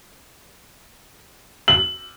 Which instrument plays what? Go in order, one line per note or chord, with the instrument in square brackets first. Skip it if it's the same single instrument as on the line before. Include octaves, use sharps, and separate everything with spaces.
[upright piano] F#7